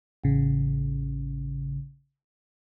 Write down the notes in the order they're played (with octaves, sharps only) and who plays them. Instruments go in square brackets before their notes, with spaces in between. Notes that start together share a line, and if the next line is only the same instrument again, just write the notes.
[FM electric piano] A1 C#3